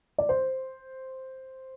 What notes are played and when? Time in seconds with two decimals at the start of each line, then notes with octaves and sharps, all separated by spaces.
0.18 D5
0.29 C5